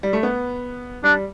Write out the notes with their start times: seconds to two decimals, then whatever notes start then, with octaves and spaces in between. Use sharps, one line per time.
0.03 G3
0.13 A3
0.23 B3
1.04 G3 D4